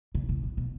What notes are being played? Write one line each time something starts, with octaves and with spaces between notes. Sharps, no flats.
C#3
A2
A2
B2